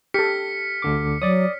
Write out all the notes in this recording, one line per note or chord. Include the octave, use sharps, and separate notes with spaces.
G4 A4 F6 B6 C#7
D2 D3 D6
F#3 C#5 D5 D#6